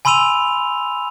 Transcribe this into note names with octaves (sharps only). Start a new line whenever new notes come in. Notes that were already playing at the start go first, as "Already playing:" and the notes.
G#5 B5 C6 E6 D#7 F7